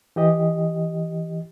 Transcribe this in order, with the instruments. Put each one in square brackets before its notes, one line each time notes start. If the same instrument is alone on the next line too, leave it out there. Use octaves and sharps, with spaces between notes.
[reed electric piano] E3 G4 D#5